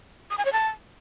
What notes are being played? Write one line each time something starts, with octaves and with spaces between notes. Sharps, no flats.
D#6
G#5
C#5
A5